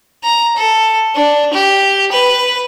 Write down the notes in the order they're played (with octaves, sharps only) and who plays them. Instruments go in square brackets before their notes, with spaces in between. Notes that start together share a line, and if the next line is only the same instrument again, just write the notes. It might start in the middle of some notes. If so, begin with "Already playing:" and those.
[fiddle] A#5
A4
D4
G4
B4